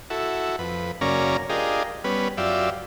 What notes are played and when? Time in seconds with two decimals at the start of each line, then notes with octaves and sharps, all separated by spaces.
0.10 E4 F#4 A4
0.59 F2 B4
1.01 F#2 C#3 A#3 C#4 D5 A#5
1.50 D4 F4 G4 G#4 A#4 D#5
2.04 G3 B3 C#4 B4
2.38 F#2 F4 G4 D5 E5